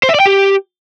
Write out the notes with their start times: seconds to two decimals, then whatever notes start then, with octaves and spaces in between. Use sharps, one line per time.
0.03 C5
0.09 E5
0.14 D5
0.20 G5
0.26 G4